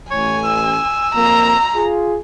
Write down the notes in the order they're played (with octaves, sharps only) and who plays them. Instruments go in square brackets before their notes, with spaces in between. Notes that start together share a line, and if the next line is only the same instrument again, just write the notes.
[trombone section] A1 [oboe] C#5 [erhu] G#5
[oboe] E6
[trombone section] F2 A#3 [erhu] A#5
[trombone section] F4 G#4